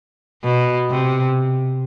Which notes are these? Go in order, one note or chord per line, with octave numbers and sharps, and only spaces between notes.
B2
C3